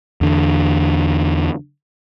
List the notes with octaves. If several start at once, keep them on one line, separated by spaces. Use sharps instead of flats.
E2 D3